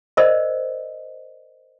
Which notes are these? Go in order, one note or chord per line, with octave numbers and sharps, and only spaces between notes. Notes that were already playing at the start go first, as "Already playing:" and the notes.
A#4 C5 D5 D#5